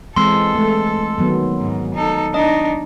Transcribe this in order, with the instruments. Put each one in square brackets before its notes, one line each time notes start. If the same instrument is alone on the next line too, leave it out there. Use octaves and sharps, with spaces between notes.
[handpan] E3 G#3 C4 [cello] A4 [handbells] C6 E6
[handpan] G#3 A3
D#3 F#3 B3
[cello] G#2
D#4 A4
[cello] D4 D#4 [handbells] D#5